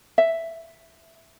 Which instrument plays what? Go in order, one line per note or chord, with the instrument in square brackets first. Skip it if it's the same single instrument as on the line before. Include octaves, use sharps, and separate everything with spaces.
[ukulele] E5